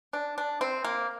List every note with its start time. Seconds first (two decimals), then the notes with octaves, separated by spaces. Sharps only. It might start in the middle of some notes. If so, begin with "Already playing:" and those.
0.13 D4
0.38 D4
0.61 C4
0.84 A#3